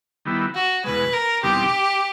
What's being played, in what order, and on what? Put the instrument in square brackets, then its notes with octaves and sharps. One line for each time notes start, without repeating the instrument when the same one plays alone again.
[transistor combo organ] D#3 G3 B3 E4
[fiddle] F#4
[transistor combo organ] E2 B2 G#3 [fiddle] B4
[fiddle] A#4
[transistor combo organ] E2 B2 G3 C4 D#4 [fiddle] G4